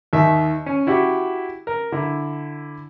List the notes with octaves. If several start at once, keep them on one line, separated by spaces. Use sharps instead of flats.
D#2 D#3 E5
C#4
E4 F#4 G4
A#4
D3 E4